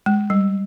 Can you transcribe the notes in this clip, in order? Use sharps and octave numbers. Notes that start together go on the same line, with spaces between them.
G#3
G3